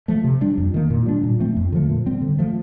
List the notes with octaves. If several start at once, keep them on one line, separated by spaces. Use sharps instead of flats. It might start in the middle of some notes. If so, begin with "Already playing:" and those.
F3 A3
C3
G3 D4
F2
D#3 A#3
A#2
G3 D4
A#2
F3 A3 C4
F2
D3 F3 A3
A#2
G3 C4
D3
F3 A3